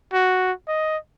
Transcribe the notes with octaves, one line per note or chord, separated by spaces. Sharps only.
F#4
D#5